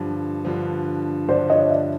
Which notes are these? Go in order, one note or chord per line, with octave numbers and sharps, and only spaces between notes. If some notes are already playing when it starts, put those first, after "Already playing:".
Already playing: G2 D3 F3
G2 D3 F3
G2 D3 F3 C5 D5
C#5 D#5
D5 E5